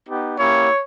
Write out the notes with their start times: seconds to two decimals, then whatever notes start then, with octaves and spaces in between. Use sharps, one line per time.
0.08 B3 D#4 G4
0.39 A#3 C#4 E4 G4 C#5